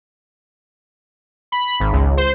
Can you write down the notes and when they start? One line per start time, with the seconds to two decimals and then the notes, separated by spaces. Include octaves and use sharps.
1.52 B5
1.80 G#1
1.92 C#2
2.17 C5